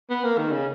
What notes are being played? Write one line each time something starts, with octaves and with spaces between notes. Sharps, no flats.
B3
A#3
D#3
C#3